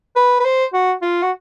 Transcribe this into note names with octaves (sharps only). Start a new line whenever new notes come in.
B4
B4
C5
F#4
F4
F#4